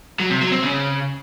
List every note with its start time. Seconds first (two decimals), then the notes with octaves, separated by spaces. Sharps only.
0.20 F#3
0.30 C3
0.41 F#3
0.52 C4
0.62 C#3